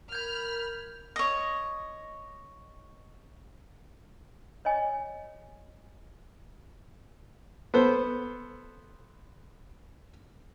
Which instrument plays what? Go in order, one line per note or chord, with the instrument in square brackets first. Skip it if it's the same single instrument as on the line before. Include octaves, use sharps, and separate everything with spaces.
[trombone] A#4 [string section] B5 F6 [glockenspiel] G6 G#6
[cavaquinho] C#5 D#5
[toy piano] C#5 D#5 G#5
[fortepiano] B3 A4 C5